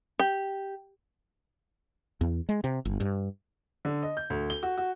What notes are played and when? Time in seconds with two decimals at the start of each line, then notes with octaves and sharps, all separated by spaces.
0.20 G4
2.21 E2
2.49 G#3
2.64 C3
2.85 G1
3.00 G2
3.85 D3
4.03 D#5
4.17 G6
4.30 D2
4.50 G7
4.63 F#4
4.78 F#4